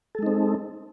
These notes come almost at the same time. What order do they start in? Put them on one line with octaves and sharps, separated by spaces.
A4 G#3 D#4 C4